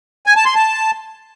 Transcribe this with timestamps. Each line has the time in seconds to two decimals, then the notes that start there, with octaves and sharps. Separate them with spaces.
0.26 G#5
0.36 A5
0.45 C6
0.55 A5